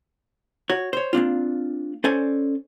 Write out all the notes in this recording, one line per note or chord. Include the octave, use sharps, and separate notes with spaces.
F#4 C#5
C5 C#5
A#3 C4 D4 F4
C#4 A4 C5 D5 G#5